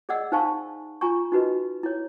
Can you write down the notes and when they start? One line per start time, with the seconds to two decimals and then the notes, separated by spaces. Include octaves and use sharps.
0.09 G#4 D5 D#5 F#5 E6
0.32 D#4 C5 F5 G#5 A5 C#6
1.01 F4 G#5 A#5 C#6
1.32 D#4 F#4 B4 D#5
1.83 E4 C#5